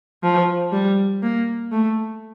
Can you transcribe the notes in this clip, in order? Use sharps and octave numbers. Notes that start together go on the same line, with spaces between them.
F3
G3
A#3
A3